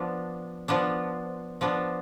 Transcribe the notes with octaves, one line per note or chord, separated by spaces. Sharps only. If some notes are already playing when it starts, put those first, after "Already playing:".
Already playing: F3 B3 D4
F3 B3 D4
F3 B3 D4